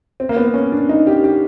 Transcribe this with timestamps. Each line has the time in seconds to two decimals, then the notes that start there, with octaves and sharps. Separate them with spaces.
0.20 C4
0.29 A#3
0.36 B3
0.54 C#4
0.72 D4
0.89 D#4
1.07 G4
1.24 G4